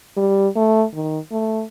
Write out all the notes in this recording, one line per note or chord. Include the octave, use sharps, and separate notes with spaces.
G3
A3
D#3
A3